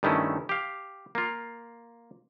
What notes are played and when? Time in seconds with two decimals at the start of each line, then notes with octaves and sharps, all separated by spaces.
0.03 G2 D#3 A3 C#4 E4
0.49 G4 F5
1.15 A#3 F4